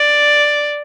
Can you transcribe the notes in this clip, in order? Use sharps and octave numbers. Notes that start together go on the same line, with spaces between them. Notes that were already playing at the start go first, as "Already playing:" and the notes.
Already playing: D5